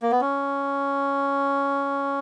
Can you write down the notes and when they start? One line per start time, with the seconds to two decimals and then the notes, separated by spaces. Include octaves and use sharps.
0.02 A#3
0.11 B3
0.21 C#4